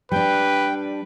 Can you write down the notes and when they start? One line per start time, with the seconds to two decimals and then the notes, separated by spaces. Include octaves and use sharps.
0.12 G3 D4 B4 G5